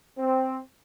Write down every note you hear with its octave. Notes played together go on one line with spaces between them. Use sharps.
C4